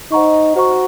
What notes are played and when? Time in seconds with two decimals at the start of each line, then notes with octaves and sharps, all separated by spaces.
0.12 D#4 C5 F#5 A#5 C#6
0.56 F#4 C5 F#5 A#5 C#6